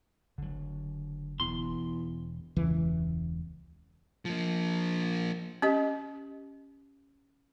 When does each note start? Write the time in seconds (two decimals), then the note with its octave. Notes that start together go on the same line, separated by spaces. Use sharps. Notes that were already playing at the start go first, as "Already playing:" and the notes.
0.38 F#1 D3 F#3
1.40 E1 E2 C6
2.56 E1 C#2 E3
4.25 F3 A#3
5.62 C#4 G4 D#5